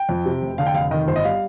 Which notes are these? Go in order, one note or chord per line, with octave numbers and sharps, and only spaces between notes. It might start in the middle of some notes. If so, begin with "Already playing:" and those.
Already playing: G5
F2
C3
F1
D3 F5
G5
F1 F5
D#3 D#5
G1 C5
D#5
G3 F5